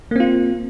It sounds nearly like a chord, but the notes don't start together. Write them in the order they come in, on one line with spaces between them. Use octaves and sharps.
A#3 C4 F4